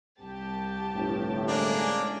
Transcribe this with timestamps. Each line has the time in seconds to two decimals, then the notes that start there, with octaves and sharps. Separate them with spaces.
0.19 C2 G4 A5
0.95 G1 A2 C3
1.48 G#3 A#3 C#4 D4 G#4